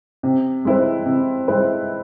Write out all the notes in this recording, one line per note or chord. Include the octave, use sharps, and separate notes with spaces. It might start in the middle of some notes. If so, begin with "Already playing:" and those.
C3
G#3 C4 E4 B4
C3
G#3 C4 E4 B4